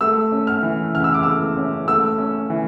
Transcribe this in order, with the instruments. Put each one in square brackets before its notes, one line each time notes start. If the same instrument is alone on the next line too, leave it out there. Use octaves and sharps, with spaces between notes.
[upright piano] A3 E6
C#4
F6
E3
C#3 F6
E6
D6
A3 E6
C#4
A3 E6
C#4
E3